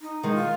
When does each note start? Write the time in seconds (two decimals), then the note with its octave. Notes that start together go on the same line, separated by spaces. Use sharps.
0.01 D#4
0.23 D#3 G#3
0.34 F4